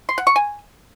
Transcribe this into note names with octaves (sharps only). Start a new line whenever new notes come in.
C6
F#5
C#6
G#5